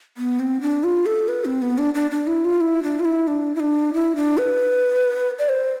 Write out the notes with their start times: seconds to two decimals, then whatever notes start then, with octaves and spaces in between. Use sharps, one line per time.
0.17 B3
0.39 C4
0.61 D4
0.84 F4
1.06 A4
1.28 B4
1.45 C4
1.62 B3
1.78 D4
1.95 D4
2.11 D4
2.27 E4
2.45 F4
2.61 E4
2.83 D4
3.00 F4
3.05 E4
3.27 D4
3.55 E4
3.60 D4
3.94 E4
4.16 D4
4.38 B4
5.39 D5
5.49 C5